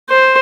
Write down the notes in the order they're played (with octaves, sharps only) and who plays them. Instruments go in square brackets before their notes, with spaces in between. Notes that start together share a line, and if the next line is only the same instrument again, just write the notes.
[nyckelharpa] C5